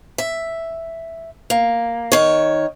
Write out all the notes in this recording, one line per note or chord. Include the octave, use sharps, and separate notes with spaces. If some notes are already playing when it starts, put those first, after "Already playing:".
E5
A#3
D#3 C#5